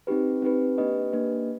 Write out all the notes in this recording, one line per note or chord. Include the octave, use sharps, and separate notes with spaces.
C4 D#4 G4 B4
C4 D#4 G4 B4
A#3 D4 G4 B4 D#5
A#3 D4 G4 B4 D#5